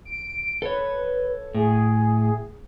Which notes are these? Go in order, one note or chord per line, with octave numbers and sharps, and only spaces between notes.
D7
A4 B4 C#5
A2 G#4